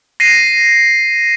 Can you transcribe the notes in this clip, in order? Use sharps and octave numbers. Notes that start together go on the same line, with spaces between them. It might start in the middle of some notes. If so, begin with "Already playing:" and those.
A#6 C7 D#7